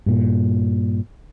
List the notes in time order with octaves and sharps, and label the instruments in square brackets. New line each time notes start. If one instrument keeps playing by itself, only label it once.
[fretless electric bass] G2 A#2